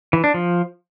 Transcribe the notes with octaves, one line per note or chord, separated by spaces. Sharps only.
E3
D4
F3